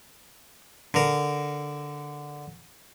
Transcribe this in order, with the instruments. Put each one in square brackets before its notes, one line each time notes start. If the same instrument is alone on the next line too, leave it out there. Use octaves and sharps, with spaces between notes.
[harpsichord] D3 A#4